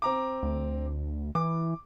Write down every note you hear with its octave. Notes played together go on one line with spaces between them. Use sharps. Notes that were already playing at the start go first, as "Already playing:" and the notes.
C4 A#5 D6
D2
E3 D6